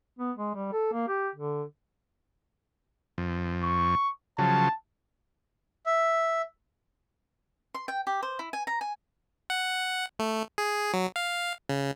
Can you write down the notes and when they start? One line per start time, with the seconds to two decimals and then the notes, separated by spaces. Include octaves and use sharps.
0.19 B3
0.37 G#3
0.55 G3
0.72 A4
0.93 A#3
1.08 G4
1.35 D3
3.18 F2
3.63 C#6
4.38 C#3 F3 F#3 A5
5.86 E5
7.74 C6
7.88 G5
8.07 G4
8.23 C5
8.39 E4
8.53 G#5
8.67 A#5
8.81 G#5
9.50 F#5
10.19 A3
10.58 G#4
10.94 F#3
11.16 F5
11.69 C#3